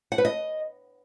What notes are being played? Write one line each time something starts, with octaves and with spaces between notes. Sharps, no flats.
F#5
B4
D#5